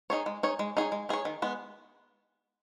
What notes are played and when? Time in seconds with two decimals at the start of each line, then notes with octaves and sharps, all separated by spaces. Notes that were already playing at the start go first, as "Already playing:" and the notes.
0.10 D#4 G#4 C#5
0.26 G#3
0.43 D#4 G#4 C#5
0.59 G#3
0.77 D#4 G#4 C#5
0.92 G#3
1.09 D#4 G#4 C#5
1.25 D#3
1.42 G#3 B3